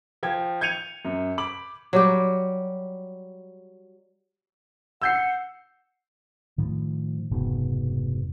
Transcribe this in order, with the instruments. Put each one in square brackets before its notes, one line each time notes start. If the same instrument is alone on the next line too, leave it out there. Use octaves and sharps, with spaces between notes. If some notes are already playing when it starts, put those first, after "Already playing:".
[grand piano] F3 G5 G#6
G6 G#6 C#7 D#7 F7
F#2
B5 D6 F#7
[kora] F#3 G3 G4
[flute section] F#5 [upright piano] E6 G6 C7
[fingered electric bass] A2 D#3 F3
F1 G#2 B2